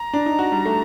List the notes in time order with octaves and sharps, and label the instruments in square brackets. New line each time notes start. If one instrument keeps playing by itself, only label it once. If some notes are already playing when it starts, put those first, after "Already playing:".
Already playing: [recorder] A#5
[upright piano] D4
D#4
F#4
G3
A3